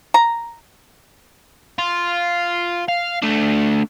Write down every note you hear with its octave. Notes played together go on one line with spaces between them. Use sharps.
A#5
F4
F5
A3 D4